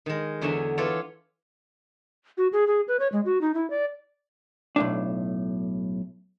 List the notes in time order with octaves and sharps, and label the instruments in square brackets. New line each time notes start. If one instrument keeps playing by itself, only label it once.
[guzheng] D#3 G#3
E2 D3 F#3 C#5 E5 G#5
E3 F4 A4 C#5 D5
[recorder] F#4
G#4
G#4
B4
C#5
G#3
F#4
D#4
E4
D5
[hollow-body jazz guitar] B1 A2 D4